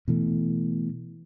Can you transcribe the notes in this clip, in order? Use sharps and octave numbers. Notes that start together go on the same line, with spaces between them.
B2 E3 A3